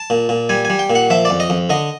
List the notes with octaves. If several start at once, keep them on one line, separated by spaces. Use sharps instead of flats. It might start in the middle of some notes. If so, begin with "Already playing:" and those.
Already playing: A5
A#2
A#2
G3 G#5
G3 G#5
G5
A#2
F#5
F3 E5
F2 D5
D#5
F2
D3 D#5